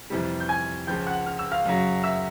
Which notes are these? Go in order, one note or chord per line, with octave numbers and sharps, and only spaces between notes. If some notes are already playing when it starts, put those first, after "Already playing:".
F2 C3 E3 G3
G6
G#5 G#6
C#2 C#3 F3 G5 G6
F#5 F#6
F6
E6
F5 F6
F#2 C#3 F#3
E5 E6